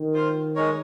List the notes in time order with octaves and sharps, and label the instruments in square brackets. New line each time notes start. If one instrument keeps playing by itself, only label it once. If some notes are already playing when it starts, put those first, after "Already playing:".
Already playing: [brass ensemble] D#3
[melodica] F4 C5 F5
G#3 D#4 A#4 C#5